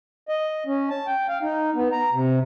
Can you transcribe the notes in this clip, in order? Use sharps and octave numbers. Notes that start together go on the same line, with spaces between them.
D#5
C#4
A5
G5
F5
D#4
B3
A#5
C3